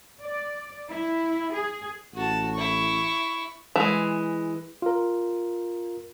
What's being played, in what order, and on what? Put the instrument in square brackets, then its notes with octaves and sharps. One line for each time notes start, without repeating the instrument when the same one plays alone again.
[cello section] D5
E4
G#4
[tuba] A1 [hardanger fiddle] F#4 A5
[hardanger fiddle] E4 C#6
[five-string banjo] E3 G#3
[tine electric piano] F4 A#4